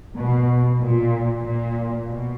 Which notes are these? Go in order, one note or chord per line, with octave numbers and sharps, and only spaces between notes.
B2
A#2
A#2
B2